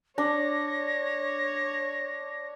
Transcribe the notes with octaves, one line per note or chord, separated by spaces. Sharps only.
D4 C#5 A#6